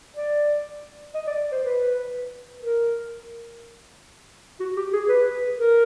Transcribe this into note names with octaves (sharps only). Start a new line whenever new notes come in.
D5
D#5
D5
C5
B4
A#4
F#4
G4
G#4
B4
A#4